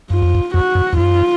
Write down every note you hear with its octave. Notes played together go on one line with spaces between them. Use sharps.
F#2 F4
F2
F#2
F2 F#4
F#2
F2
F#2 F4